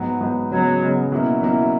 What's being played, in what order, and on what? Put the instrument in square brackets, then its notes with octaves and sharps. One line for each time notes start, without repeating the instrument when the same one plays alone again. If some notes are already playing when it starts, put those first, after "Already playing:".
Already playing: [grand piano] G#2 F#3 B3
G#2 F#3 B3
[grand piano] C#3 G#3 B3 [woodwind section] F#3
[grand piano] C#3 G#3 B3
B2 F#3 A#3 C#4 E4
B2 F#3 A#3 C#4 E4